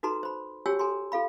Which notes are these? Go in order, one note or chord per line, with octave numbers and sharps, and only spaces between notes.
D#4 F#4 A4 B4 A#5 C6
C5 B5
F#4 G4 C#5 G5 G#5 E6
A4 G#5 A#5 C6
F4 A4 F5 B5